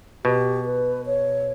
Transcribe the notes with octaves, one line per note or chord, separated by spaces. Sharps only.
B2 G4
B4
C#5